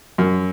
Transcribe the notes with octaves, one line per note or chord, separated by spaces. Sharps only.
F#2